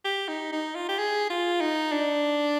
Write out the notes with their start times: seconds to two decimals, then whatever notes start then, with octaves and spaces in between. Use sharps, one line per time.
0.05 G4
0.28 D#4
0.52 D#4
0.75 F4
0.88 G4
0.99 G#4
1.30 F4
1.61 D#4
1.92 D4